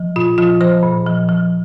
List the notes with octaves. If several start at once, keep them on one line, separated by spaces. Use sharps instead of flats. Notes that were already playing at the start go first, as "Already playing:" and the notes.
Already playing: F3
A#2 F4
F3 F4
F3 C5
A#2
F3
F3